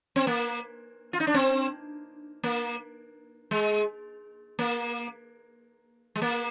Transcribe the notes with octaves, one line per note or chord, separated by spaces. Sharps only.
C4
A#3
F4
D#4
D4
C4
A#3
G#3
A#3
G#3
A#3